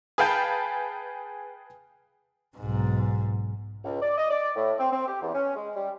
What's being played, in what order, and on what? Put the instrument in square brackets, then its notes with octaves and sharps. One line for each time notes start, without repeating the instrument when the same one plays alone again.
[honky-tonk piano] G#4 B4 F5 G5 A5 G6
[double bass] B1 G#2
[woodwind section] C#2
D5
D#5
D5
A2
C4
C4
G4
E2
C#4
G#3
G3